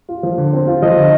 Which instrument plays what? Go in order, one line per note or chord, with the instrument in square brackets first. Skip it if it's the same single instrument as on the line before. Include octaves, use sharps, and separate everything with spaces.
[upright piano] F4
F3
D3
C4
F4
[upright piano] F3 [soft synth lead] D#5
[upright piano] D3